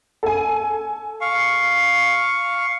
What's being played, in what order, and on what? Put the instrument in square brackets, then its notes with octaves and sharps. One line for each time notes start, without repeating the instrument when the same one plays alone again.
[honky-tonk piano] A4 G#5
[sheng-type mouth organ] F5 C#6